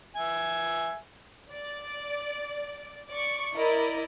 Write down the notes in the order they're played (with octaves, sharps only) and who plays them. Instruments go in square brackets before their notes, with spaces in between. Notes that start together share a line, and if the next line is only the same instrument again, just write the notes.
[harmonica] E5 G#5
[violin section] D5
D5 C#6
E4 A#4 D5 D#5